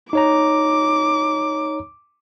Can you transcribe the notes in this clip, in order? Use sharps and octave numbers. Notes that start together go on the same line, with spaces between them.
D#4 C#5 A#5 D6